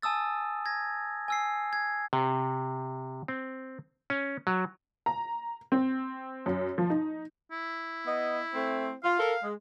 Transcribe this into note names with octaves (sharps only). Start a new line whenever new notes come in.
G#5 A5 D#6 E6 A6
G#6 A#6
G#5 E6 C7
G#6
C3
C4
C#4
F#3
A#5
C4
F#2
F3
D#4
E4
B3 D#5
A3 C4
F4 F5
A4 A#4
G#3